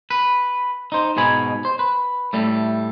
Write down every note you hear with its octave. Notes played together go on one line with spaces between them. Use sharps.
B4
D#4 C5
G#2 B2 D#4 G#5 B5
C5
B4
A2 G3 A3